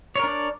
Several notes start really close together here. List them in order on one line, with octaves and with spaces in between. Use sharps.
C#5 A#4 D4 D5